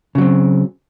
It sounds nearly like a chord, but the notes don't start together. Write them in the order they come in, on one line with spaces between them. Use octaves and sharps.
C#3 F#3 C4